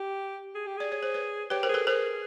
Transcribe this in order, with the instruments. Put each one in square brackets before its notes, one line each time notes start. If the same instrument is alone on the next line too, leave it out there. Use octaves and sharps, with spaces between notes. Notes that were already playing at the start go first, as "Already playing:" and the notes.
Already playing: [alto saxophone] G4
G#4
G4
[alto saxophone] G#4 [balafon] D5
[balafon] C#5
C5
B4 C#5
[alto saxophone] G4 [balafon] B4 C#5
[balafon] A#4 C5
[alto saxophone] G#4
[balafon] A4 B4
[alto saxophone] G#4 [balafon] A#4 C5